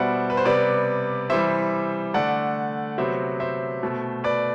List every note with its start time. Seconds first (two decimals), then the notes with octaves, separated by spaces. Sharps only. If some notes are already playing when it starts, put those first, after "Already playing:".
Already playing: B2 G3 B3 C5 D5 E5 F#5
0.30 B4
0.37 C5
0.45 C3 G3 B3 B4 D5
1.30 C3 E3 G3 C5 E5
2.14 D3 A3 D5 F#5
2.98 C3 F#3 B3 C5 E5
3.40 C5 E5
3.83 B2 A3
4.24 B4 D5